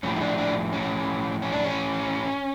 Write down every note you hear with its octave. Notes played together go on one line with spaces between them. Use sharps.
A2 F3 C#4
D#4
D4
D4
C#4
C#4
D4
C#4